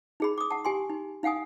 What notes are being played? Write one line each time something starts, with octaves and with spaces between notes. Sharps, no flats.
D#4 G#4 B5
D6 D#6
F#5 A5
G4 G#5 C6
D#4
D#4 F5 F#5 G#5 D#6